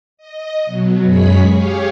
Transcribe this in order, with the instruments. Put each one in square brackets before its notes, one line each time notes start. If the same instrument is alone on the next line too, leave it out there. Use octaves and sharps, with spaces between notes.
[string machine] D#5
B2 F#3
F#2 G#3 G#4 C#5 B5 B6
G4 G#4 C#5 F5